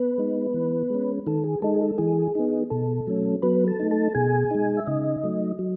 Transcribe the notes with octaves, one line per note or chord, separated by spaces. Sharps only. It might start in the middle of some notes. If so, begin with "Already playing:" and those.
Already playing: B3 B4
G#3 D#4
E3
G#3 C#4
D#3 A4
G#4
G#3 D#4 A4
G#4
A4
E3 G#4
B3 D#4
B2 A4
F#3 A3 C#4
F#3 B3 B4
A4 A5
A3 D#4
A4 A5
B2 G#4 G#5
G#3 D#4
E5
C#3 D#4 D#5
F#3 A3
F#3